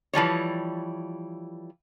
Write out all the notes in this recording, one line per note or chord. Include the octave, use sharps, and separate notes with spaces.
E3 F3 G3 C#5